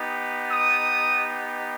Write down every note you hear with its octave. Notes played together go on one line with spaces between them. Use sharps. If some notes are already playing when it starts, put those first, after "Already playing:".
Already playing: B3 D#4 G4
D#6